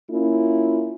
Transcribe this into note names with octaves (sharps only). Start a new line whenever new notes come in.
A#3 C#4 E4 F4